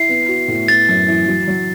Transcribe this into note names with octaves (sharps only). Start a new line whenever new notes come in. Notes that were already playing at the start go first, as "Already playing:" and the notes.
Already playing: E4 C7
B3
F#4
A2
B3 A6
F#2
E3
F#3
F#3